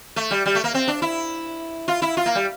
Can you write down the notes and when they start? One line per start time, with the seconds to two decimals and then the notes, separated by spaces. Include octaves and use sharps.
0.16 A3
0.31 G3
0.46 G3
0.55 A3
0.64 A#3
0.74 C4
0.88 D4
1.02 E4
1.88 F4
2.02 E4
2.17 F4
2.26 A#3
2.35 G3